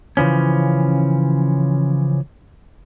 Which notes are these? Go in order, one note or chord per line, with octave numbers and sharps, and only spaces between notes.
C#3 E3 F3 C#4